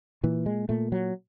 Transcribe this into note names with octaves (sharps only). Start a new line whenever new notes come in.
A#2 E3
G#3
A#2 A3
F#3